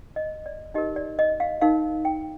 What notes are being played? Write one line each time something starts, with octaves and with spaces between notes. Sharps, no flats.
D#5
D5
D#4 G4 A#4 D#5
D5
D#5
F5
D#4 A#4 F5
G5